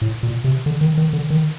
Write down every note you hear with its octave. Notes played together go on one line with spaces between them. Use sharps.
A2
A#2
C3
D3
D#3
D#3
D3
D#3